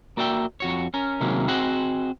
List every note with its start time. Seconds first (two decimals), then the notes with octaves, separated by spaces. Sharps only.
0.17 A#3 F#4 D5 E5 G5
0.60 F2 F#4 C#5
0.94 C#4 A#4
1.21 C3 D#3 F#3 G#3 A#3 C#4
1.48 C4 F#4 G#4 C5 D#5 F#5